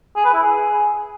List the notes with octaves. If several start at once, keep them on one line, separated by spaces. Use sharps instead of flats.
G#4
B4
E4
G#4